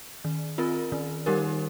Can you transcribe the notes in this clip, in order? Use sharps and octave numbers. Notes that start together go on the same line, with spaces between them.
D#3
C4 F4 A#4
D#3
G3 D#4 G4 A#4